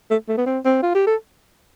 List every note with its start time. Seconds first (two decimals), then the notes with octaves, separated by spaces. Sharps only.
0.10 A3
0.28 A3
0.38 B3
0.46 C4
0.65 C4
0.83 F4
0.95 G4
1.07 A4